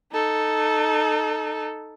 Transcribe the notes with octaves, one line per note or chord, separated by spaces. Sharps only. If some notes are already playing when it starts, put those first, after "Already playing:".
D#4 A4